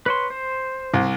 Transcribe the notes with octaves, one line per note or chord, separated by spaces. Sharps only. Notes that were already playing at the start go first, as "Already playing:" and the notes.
B4 C#5 C6
C5
C2